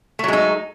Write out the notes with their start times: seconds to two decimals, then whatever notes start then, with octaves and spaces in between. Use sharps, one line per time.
0.19 A3
0.24 F#3
0.28 G#3
0.33 D#4